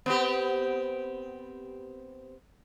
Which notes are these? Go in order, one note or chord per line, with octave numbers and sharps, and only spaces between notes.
B3 C4 G4